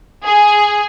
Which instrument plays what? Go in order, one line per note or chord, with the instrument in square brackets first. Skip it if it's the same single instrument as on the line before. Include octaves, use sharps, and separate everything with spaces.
[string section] G#4